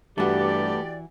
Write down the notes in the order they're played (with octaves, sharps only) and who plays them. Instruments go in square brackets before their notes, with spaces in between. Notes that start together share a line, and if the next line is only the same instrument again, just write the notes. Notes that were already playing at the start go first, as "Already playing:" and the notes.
[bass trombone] G2 [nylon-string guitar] E3 F#4 [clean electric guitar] A3 B3 [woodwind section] G4 D5